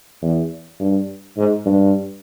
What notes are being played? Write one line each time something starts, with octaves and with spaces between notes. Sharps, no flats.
E2
G2
G#2
G2